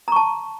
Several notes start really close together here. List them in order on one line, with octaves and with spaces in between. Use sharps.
A#5 C#6 A5